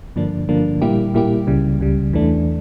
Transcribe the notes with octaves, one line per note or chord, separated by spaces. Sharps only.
G2 D3 F3 A#3 D4
G2 D3 F3 A#3 D4
A#2 G3 A#3 E4 G4
A#2 G3 A#3 E4 G4
C#2 C#3 G3
C#2 C#3 G3
E2 E3 A3 D4